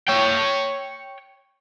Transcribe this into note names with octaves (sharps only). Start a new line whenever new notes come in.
C#5 G5